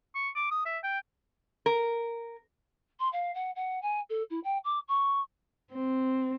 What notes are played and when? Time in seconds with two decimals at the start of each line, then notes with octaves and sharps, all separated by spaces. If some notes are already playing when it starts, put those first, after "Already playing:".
0.15 C#6
0.35 D6
0.51 D#6
0.66 E5
0.84 G5
1.66 A#4
3.00 C6
3.12 F5
3.34 F#5
3.56 F#5
3.82 G#5
4.09 A4
4.30 E4
4.44 G5
4.64 D6
4.88 C#6
5.73 C4